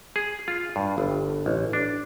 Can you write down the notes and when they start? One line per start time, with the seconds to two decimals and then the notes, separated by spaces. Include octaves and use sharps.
0.16 G#4
0.48 F4
0.76 G2
0.98 G1
1.46 A1
1.73 D4